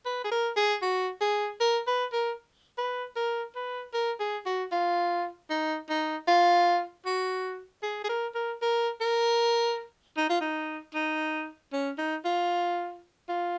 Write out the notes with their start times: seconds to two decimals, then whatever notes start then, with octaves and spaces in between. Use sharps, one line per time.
0.06 B4
0.25 G#4
0.32 A#4
0.57 G#4
0.82 F#4
1.21 G#4
1.61 A#4
1.87 B4
2.13 A#4
2.78 B4
3.16 A#4
3.55 B4
3.94 A#4
4.20 G#4
4.46 F#4
4.72 F4
5.50 D#4
5.90 D#4
6.28 F4
7.06 F#4
7.83 G#4
8.04 G#4
8.09 A#4
8.35 A#4
8.62 A#4
9.01 A#4
10.17 D#4
10.30 F4
10.41 D#4
10.94 D#4
11.73 C#4
11.98 D#4
12.25 F4
13.29 F4